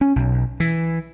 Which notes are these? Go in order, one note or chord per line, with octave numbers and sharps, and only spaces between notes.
C#4
B1
E3